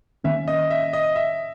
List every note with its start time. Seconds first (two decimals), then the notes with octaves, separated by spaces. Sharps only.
0.24 D#3 A#3 C#4 E5
0.48 D#5
0.70 E5
0.93 D#5
1.16 E5